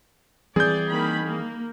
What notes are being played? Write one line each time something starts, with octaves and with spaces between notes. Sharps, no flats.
E3 G3 C4 G#4 D5 G6
D#3 A#3 B5
A#3